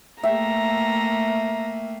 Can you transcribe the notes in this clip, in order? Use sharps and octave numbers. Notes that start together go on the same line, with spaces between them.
A3 A#3 E5 G5 A#5